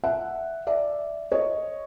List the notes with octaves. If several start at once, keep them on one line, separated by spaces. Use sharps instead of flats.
E5 F#5
D5 E5
C#5 D#5